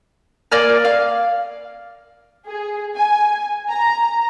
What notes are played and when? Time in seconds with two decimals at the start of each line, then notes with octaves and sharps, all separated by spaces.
0.52 A#3 D5 G#5 F6
0.85 F5
2.46 G#4
2.97 G#5
3.70 A#5